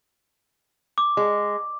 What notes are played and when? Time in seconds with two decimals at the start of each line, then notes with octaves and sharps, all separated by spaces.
0.98 D6
1.17 G#3